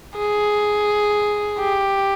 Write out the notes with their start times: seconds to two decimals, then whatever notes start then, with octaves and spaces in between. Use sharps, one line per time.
0.18 G#4
1.60 G4